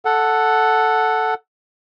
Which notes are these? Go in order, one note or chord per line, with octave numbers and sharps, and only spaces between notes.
A4 F#5